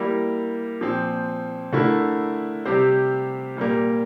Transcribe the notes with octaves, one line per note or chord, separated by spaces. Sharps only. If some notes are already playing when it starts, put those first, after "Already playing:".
Already playing: G3 A#3 E4
A#2 F3 C4
D3 A3 E4 A#4
C3 G3 C4 G4 C5
A#2 G3 A#3